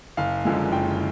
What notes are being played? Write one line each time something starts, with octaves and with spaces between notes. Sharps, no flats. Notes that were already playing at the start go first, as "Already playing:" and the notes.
F#1 F5
F#2 D3 F3 G#3
F#1 G5